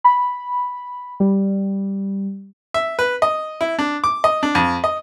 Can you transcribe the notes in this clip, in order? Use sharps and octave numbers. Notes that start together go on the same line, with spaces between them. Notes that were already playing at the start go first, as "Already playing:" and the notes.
B5
G3
E5
B4
D#5
E4
D4
D6
D#5
D4
F2
D#5